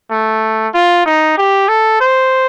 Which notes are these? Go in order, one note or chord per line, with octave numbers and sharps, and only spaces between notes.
A3
F4
D#4
G4
A4
C5